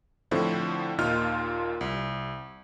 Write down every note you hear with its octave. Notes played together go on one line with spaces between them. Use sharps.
A2 D3 F3 C4 E4
D#2 A#2 D#4 F4 F6
C2